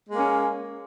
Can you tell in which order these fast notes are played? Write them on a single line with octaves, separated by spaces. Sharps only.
G#3 A#3 C#4